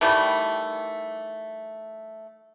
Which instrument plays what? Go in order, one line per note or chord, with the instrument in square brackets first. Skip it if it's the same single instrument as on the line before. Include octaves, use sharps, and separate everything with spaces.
[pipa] D#3 E3 G3 A3